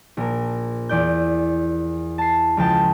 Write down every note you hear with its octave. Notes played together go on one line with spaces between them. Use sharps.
A#1 A#4
E2 D5 G6
A5 C7
C#2 F3 G5 A5